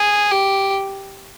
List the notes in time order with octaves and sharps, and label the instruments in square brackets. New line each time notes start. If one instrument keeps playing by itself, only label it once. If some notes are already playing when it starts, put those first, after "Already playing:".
Already playing: [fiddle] G#4
G4